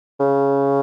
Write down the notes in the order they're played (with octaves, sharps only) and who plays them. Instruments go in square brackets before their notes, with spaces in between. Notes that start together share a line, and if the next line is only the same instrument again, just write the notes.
[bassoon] C#3